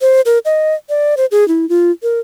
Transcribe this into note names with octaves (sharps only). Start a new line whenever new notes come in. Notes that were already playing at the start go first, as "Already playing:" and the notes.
C5
A#4
D#5
D5
C5
G#4
E4
F4
A#4